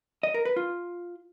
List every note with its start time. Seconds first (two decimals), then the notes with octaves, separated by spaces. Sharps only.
0.23 D#5
0.34 A#4
0.45 B4
0.56 F4